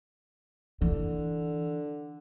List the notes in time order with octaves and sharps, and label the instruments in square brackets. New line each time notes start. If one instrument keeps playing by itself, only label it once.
[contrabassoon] D3 [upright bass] E3